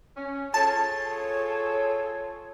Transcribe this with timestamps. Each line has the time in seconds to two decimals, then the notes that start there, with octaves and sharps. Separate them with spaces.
0.16 C#4
0.54 F4 G#4 A4 C#5 A5